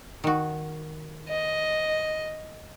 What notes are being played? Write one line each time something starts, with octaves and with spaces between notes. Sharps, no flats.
D#3 F#4
D#5